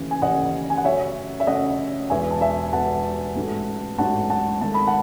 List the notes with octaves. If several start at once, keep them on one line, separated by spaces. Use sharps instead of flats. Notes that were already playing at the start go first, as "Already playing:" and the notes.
Already playing: D#2 C#3 E3 A3 C#4
G#5
D#2 C#3 E3 A3 C#4 D#5 F#5
G#5
F#5
F#2 C#3 F#3 A3 C#4 C#5 E5
E5
F#2 C#3 F#3 A3 C#4 D#5 F#5
E1 E2 B2 E5 G#5
A5
E5 G#5
E1 E2 B2 F#5 A5
A1 G#2 F#3 A3
A1 G#2 F#3 A3 F#5 A5
F#5 A5
G#1 G#2 D#3 A3 A5
B5
F#5 A5